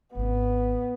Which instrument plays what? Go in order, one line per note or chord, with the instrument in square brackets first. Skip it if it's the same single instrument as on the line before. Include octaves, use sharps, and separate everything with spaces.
[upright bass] G#1 C#4 [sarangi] B3